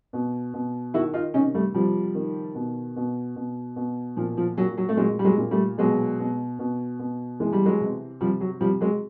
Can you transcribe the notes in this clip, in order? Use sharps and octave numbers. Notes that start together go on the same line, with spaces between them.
B2
B2
D#3 E4 F#4
D#4 F4
C3 C#4 D#4
G3 A3
C3 F3 G3
D#3
B2
B2
B2
B2
A#2 F3
F3
A#2 F#3
F#3
A3
A#2 F#3 G#3
G3
F#3 G#3
A#2
G3 A3
B2 F#3 G#3
B2
B2
B2
E3 G#3
G3
F#3 G#3
C3
C3 F3 G3
F#3
C3 F3 G3
F#3 G#3